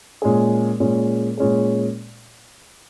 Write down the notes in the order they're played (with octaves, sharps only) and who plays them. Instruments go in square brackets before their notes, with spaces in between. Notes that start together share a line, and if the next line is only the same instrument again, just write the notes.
[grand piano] A#2 G#3 C#4 G#4
A#2 G#3 C#4 G#4
A#2 G#3 C#4 G#4